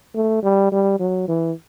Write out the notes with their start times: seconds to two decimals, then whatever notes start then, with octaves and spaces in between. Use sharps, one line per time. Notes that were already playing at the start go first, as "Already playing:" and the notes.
0.15 A3
0.43 G3
0.72 G3
0.99 F#3
1.28 E3